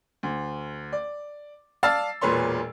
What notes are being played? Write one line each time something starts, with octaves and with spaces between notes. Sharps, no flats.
D2
D5
D5 F5 A5 E6 A6 C7
E1 A#2 B4 C#5 C6